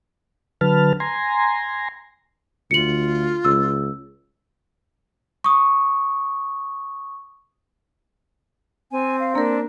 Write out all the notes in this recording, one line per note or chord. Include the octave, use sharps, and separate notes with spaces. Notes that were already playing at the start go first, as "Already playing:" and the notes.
D3 F#3 B4 A5 F6
G#5 A#5 C6
D2 F4 C#7 F#7
C#2 E6
C#6 D#6
C4 G#5
F5
A#3 D4 A#4